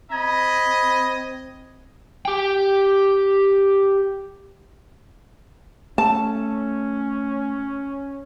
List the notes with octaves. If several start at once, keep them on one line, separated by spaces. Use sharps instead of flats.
C4 D#5 B5 G#6
G4 G5
A3 C#4 A5